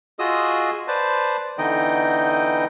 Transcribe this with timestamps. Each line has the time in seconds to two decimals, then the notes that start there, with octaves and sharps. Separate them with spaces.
0.19 F4 F#4 G#4 D#5 D#6 E6
0.88 B4 C5 D5 A5
1.58 D3 E3 B3 D#4 D#5 G5